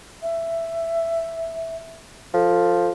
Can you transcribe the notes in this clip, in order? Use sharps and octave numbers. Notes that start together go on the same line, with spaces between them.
E5
F3 A4